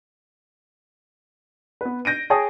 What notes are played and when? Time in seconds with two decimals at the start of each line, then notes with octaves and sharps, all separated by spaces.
1.81 B3 B4
2.05 G6 A#6 D7 D#7
2.30 G#4 C#5 G5 A5 C#6 D#6